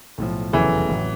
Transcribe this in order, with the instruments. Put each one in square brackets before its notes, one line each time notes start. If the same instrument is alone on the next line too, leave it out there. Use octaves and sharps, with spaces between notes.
[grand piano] B1 A2 F3
[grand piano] F1 E2 C#3 F#3 A3 [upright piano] E3
[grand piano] A1 A2 F#3